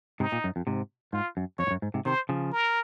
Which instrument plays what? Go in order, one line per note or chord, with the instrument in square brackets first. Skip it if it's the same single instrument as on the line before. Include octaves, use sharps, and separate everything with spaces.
[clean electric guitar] G#2 C3 [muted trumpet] D#4
[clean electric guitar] A#2
F#2
F2
G#2 C3
[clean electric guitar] G#2 [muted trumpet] F4
[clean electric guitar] F#2
[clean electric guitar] F2 [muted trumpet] C#5
[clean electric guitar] G#2
F#2
G#2
G#2 C3
[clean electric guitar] C3 D#3 [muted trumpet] C5
[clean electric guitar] C#3 F3
[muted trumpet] A#4